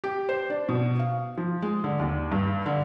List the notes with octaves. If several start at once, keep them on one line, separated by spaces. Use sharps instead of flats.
G4
C5
D4
B2
F5
F3
G#3
D3
D#2
G2
D3